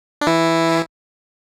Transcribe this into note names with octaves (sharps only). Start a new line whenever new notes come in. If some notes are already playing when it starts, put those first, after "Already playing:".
D4
E3 E4